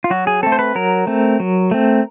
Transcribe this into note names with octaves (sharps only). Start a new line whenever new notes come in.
F4
F#3 F#4
G#4
A3 C4 A4
C5
B4
F#3 A#4
A3 C4
F#3
A3 C4